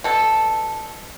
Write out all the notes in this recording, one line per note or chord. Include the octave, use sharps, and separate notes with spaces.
B2 A4